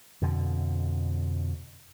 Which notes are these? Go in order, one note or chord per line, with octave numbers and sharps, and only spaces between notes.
F2 B2 D3